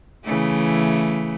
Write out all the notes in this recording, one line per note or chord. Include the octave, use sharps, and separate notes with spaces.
C#3 E3 A3